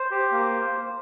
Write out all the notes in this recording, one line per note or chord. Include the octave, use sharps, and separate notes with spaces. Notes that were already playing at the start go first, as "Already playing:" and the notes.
Already playing: C5
G4
A#3